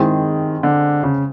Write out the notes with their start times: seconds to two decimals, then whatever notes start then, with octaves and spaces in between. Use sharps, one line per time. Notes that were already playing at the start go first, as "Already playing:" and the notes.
Already playing: D#3 G#3 C4 E4 G#4
0.63 D3
1.03 C#3